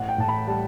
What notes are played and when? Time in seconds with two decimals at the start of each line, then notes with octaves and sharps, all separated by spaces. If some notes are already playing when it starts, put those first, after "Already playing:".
Already playing: A1 E3 F#5
0.09 G5
0.18 A2 A5
0.29 B5
0.47 G3 A5